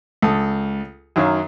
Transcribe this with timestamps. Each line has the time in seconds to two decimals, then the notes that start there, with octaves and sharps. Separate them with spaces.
0.22 C#2 A4 D#6
1.16 F#2 D#3 F#3 C#5 F5